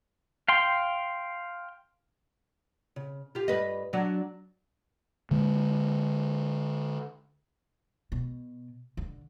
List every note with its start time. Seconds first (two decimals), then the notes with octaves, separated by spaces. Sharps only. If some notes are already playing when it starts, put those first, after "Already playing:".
0.48 F5 G5 C6
2.96 C#3
3.35 F4 G4
3.48 G2 B4 D#5
3.93 F#3 D4 F#4
5.31 D3 G#3 A#3
8.12 B2
8.97 D3